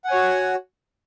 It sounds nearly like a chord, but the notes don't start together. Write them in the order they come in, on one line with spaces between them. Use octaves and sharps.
F#5 G#5 C#5 F#4